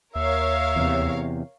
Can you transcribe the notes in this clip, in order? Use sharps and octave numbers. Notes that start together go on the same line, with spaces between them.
D#2 A#4 C#5 E5 F5
E2 C3